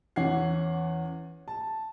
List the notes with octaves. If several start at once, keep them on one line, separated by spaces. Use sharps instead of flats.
E2 E3 C#4 F#5 G#6 C7
A5